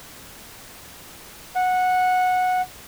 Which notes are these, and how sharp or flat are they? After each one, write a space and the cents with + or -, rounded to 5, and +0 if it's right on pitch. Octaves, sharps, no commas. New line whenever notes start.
F#5 -10